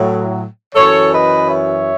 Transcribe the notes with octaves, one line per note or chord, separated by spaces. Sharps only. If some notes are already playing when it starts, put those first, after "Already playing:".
Already playing: A2 F#3
F#2 E3 A4 C#5
B4 D#5
C#5 E5